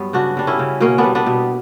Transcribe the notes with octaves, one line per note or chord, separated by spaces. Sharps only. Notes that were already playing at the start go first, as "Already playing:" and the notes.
Already playing: G2 F#3 B3
C#3 D4 F#4
G3 D4
C#4 E4
C#3
B2 A#3 C#4
B3 D4
G3
B3 D4
B2